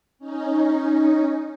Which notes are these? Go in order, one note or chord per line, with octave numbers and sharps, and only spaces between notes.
C#4 D#4